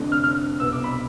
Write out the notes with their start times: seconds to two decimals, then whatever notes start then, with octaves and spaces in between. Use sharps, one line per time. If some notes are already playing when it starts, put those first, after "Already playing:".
Already playing: F1 F2 D3
0.12 F6
0.24 F6
0.60 C2 B2 B3 E6
0.72 D6
0.84 B5